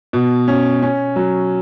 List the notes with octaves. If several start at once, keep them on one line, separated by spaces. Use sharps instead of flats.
B2
C#4
C#4
F#3